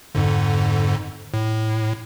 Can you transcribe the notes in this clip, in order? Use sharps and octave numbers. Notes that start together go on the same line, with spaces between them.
F2 G#2 D3
A2